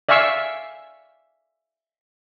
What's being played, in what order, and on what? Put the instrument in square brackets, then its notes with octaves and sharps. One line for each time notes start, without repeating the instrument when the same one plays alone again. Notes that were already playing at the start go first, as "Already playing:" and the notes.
[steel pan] D5 E5 F5 G#5 C#6 E6